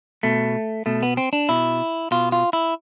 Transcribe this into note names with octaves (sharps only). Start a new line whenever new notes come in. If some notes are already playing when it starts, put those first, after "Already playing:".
B2 A3
B2 A3
B3
C4
D4
B2 E4
B2 F4
F4
E4